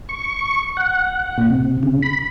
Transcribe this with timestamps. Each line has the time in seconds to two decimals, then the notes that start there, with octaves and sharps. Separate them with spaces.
0.09 C#6
0.77 F#5
1.38 A#2
1.50 C3
1.83 C#3
2.03 B5